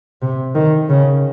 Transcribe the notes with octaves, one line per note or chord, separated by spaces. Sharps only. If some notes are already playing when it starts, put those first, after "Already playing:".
C3
D#3
C#3